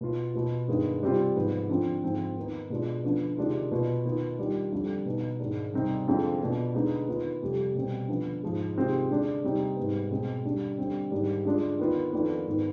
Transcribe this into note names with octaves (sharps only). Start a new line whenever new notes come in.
B2 B3 F4
B2 B3 F4
G2 D#3 G#3 B3
C3 G3 C4 F4
G#2 F3 B3
D3 F3 C4 F4
G#2 F3 C4 F4
D#3 B3 D#4
B2 G#3 D4 F4
D3 F3 B3
C3 D#3 G#3 D4 F4
B2 B3 F4
D#3 B3 F4
D#3 G3 D4 F4
F2 D3 G3
B2 B3 D#4
G#2 D#3 G#3 D4
C3 G3 C4 D#4
F2 D3 G#3 C4 F4
B2 B3 D4 F4
D3 G#3 B3 D#4
D#3 B3 F4
F2 C3 G3
B2 G3 C4
D3 F3 B3
G#2 F3 G#3
C3 D#3 G#3 C4 F4
D3 G#3 D4
C3 G3 C4 D#4
G#2 G3 B3
B2 G#3 C4
D3 G3 D4
D3 G3 C4
G#2 D#3 G3 D4
D3 G#3 D4 F4
D#3 B3 F4
F2 D#3 B3 D4 F4
G#2 D#3 B3